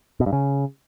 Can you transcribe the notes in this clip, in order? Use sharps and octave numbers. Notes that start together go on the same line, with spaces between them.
B2
G2
C#3